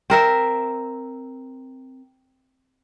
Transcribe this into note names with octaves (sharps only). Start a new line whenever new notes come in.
C4 A#4 E5